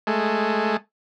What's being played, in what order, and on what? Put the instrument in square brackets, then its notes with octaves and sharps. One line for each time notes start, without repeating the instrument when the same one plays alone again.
[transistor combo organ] G#3 A3